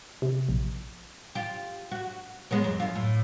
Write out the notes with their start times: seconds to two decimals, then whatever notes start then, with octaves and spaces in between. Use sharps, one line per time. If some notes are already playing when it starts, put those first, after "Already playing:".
0.22 C3
0.49 A#1
1.35 F4 G4
1.91 F#4
2.51 G#3 B3 C#5
2.64 F2
2.80 F#2 F4
2.95 A2